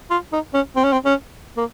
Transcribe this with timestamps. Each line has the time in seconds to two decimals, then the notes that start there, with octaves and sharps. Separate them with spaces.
0.11 F4
0.33 D#4
0.54 C#4
0.76 C4
0.84 C#4
0.92 C4
1.05 C#4
1.57 A#3